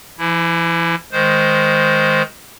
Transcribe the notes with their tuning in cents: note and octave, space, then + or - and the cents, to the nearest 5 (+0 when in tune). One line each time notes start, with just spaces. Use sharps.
E3 +40 E4 +0
D#3 +10 G#3 +0 C5 -5